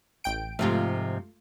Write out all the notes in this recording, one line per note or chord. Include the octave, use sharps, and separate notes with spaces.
A1 G5 D7
G#2 C3 F3 A3 F4